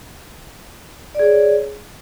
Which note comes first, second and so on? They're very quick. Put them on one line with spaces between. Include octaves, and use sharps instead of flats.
D5 G#4 C#5